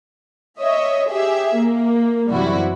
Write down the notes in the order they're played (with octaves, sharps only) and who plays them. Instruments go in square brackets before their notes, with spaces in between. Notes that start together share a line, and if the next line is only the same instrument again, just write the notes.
[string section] C#5 D#5 E5
G4 G#4 E5
A#3
F#2 C3 E3 G3 E4 F#4